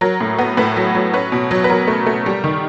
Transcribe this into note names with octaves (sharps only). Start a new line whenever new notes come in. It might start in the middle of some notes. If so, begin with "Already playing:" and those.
F#3 A#4
A2
B3
A2 B4
F#3
F#3
C#4 B4
B2
F#3
B4
F#3 A#4
A3
A3
G3
D#3